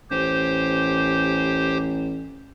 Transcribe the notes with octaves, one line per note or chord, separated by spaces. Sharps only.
A1 G4 C5